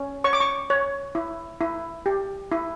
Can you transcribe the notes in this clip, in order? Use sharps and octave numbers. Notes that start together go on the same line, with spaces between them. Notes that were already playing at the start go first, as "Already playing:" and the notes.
Already playing: C#4
C#5 C#6
D6
C#6
C#5
E4
E4
G4
E4